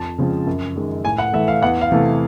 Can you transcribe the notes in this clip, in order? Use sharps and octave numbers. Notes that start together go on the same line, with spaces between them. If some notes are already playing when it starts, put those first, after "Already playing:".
Already playing: F2 A5
C#3 F3 G#3 C4
F#2
D#3 G#3
A2 G#5
F#5
E3 A3 E5
F5
E2 F#5
F5
C3 E3 A3